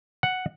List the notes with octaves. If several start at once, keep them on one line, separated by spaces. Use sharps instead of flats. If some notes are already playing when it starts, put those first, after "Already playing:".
F#5